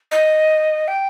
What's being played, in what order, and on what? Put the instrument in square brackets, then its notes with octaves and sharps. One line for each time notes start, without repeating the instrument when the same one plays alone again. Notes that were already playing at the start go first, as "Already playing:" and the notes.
[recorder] D#5
G5